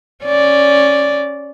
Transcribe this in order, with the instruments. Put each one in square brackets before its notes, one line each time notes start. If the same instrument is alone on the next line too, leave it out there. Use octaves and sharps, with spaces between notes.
[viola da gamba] C#4 D5